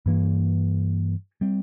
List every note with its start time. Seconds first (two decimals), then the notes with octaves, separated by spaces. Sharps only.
0.06 G2 E3 A#3
1.41 G3 C4